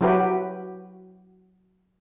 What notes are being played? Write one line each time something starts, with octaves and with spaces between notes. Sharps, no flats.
F#3 E4 F#4 G4 B4